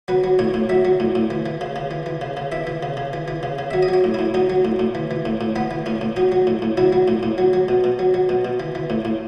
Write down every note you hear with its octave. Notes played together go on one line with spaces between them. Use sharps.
F#3 B4
F#3
A2 C#5
A2
F#3 E5
F#3
A2
A2
E3
E3
C#3
C#3
E3
E3
C#3
C#3
E3 E5
E3
C#3
C#3
E3
E3
C#3
C#3
F#3 E5
D#5
F#3
C#5
A2
E4
A2
F#3 D#4
F#3
A2
A2
E3
E3
A2
A2
E3 B3
E3
A2 C#4
A2
F#3 D#4
F#3
A2
A2
F#3 E4
F#3
A2
A2
F#3
F#3
B2
B2
F#3
F#3
B2
B2
E3
E3
A2
A2